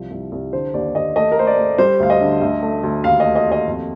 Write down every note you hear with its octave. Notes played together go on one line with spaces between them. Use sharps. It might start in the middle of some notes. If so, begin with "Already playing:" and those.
Already playing: C2 F3
C2
C2
D3 C5
D#2 D5
D#2 D#5
A3 D#5
A#4
A3 C5
D5
A3
G3 C5
D2 F5
D#5
D3
D2
A3
D2
D#2 F5
D#5
A3
D#5
D#2
D#5
F2